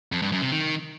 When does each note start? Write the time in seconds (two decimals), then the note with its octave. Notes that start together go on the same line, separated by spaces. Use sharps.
0.12 F2
0.22 G2
0.32 F#2
0.42 C3
0.52 D#3